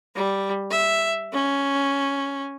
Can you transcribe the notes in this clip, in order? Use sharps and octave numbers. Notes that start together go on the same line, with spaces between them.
G3
E5
C#4